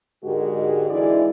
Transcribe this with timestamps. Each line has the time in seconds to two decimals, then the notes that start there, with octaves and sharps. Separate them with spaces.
0.24 G#2 D3 G#3 F#4 G4 A#4
0.90 E3 G#3 D4 E4 D5